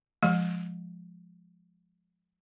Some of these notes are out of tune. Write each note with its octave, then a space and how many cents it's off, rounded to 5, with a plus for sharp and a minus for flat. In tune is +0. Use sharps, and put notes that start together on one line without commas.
F3 +0 G#3 +0